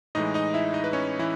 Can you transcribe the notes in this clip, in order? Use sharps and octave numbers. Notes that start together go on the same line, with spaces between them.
A2 E3 G#3 D#4 D#5
D#4 D#5
E4 E5
D#4 D#5
B4
C#4 C#5
E3 E4